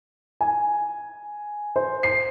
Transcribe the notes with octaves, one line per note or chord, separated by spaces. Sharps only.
G#5
C5
C7